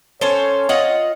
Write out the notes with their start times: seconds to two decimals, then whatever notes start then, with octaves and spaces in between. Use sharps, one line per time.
0.21 C#4 A4 C5 C#5
0.69 F4 D#5 F#5